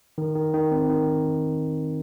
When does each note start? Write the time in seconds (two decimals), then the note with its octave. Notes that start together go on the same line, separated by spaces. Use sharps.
0.18 D#3
0.35 D#3
0.54 D#3
0.71 C4
0.89 D#3